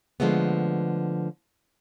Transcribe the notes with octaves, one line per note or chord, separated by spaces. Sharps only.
D3 F3 G#3 A3 B3